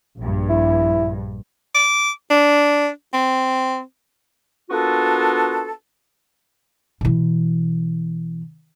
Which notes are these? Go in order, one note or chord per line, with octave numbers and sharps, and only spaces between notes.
A#1 G2
E4
D6
D4
C4
A#3 B3 D4 F4 F#4 A4
B2 E3